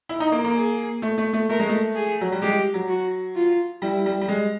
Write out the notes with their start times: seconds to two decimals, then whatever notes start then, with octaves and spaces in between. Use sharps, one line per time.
0.09 E4
0.20 D#4
0.32 A#3
0.44 A#3
0.55 G#4
1.02 A3
1.18 A3
1.33 A3
1.49 A3 A#4
1.59 G#3
1.69 A3
1.95 G#4
2.21 F#3
2.32 G3
2.42 G#3 G4
2.74 F#3
2.89 F#4
3.35 F4
3.82 G3 E4
4.06 G3
4.21 G3
4.28 G#3